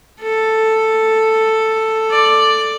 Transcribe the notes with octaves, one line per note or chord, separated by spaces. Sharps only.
A4
D5